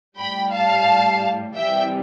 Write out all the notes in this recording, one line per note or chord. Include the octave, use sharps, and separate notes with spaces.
A2 G3 G5 B5
F5 A5
C3 E3 G3 E5 G5